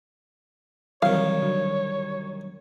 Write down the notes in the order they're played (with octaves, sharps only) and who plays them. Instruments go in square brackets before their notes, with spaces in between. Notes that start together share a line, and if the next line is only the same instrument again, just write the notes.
[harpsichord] C2 D#3 [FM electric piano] E3 F#3 C4 [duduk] C#5 [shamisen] F5
[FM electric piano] D3 F#3